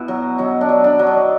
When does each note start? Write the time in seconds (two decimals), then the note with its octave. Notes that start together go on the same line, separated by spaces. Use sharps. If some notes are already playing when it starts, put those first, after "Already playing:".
Already playing: B2 E4
0.08 F#3
0.38 F#3 D#4
0.61 D4
0.69 F#3
0.84 D4
0.99 F#3
1.07 D#4